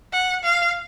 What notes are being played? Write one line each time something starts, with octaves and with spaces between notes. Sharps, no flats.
F#5
F5